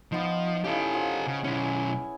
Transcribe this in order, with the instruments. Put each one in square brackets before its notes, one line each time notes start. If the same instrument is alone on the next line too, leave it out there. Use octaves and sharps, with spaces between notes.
[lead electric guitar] F3 [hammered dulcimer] B3 D#4
[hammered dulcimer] C#3 E4 [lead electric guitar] G4 A4
[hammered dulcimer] F3
[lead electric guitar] C#3
[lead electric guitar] B1 C#4 [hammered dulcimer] E4 G#5